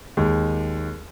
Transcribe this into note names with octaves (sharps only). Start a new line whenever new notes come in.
D#2 G#3